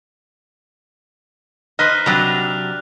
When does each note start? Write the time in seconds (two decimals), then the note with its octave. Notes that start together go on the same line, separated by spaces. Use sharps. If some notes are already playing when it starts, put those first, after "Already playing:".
1.79 D#4 B4 C5 D#5 F6 F#6
2.06 C3 F#3 G3 D4 F7